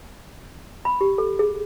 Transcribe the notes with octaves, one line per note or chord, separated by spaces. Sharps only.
B5
G4
A4
G#4